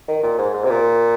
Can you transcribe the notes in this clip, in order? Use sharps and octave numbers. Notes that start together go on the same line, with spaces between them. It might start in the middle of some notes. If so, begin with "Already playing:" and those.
D#3
A#2
G#2
G#2
C3
A#2